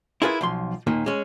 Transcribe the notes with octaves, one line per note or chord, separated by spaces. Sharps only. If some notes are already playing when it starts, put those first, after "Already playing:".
E4 F4 G#4 A#4 B4
B1 F3 C6
D#2 A#2 D#3
G#3 C#4